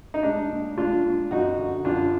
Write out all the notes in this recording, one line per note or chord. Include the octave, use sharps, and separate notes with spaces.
D#4
G#3 D4
A#2
G#3 D4 F4
A#2
F#2 D#4 F#4
D3
F#2 D4 F4